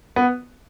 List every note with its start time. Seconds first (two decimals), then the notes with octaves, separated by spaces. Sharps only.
0.16 B3